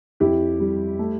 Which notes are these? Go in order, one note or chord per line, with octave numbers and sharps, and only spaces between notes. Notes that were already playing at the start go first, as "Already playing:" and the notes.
F2 E4 G4
G3
A3